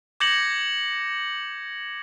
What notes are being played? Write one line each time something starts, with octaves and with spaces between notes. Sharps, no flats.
D6 G6 G#6 A#6 C#7 F#7